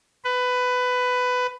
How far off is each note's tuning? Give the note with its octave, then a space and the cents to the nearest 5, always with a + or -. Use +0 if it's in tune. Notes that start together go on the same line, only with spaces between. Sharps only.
B4 +15